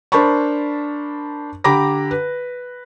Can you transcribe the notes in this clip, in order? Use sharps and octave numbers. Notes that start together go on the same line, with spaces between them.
D4 A#4 C5 A5 B5 C#6
D3 G4 A#5 B5 D6 A#6
B4